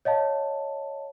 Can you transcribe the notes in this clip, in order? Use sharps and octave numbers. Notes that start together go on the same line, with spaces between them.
C#5 D#5 F5 A5